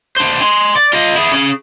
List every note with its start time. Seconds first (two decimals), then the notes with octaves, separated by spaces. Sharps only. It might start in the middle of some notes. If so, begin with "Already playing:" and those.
0.17 D4 C5
0.41 G#5 C6
0.75 D5
0.93 F4 D#5
1.16 E4 G#4
1.32 C#4 G#4